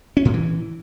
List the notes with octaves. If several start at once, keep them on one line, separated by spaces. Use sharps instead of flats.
C#4
A2
E3